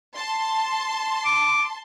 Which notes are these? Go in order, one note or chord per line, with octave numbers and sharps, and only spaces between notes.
A5 C6
D6